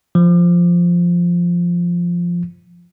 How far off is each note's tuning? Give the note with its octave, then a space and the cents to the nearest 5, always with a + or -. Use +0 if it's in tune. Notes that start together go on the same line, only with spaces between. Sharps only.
F3 -5